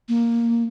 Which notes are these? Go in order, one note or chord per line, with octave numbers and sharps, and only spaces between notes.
A#3